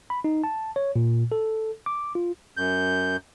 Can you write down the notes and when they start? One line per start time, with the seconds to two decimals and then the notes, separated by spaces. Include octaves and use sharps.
0.10 B5
0.24 D#4
0.44 A5
0.76 C#5
0.96 A#2
1.32 A4
1.86 D6
2.15 F4
2.57 F#2 G6